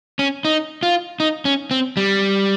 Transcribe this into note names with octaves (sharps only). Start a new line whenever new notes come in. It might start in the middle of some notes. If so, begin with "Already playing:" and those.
C#4
D#4
F4
D#4
C#4
C4
G3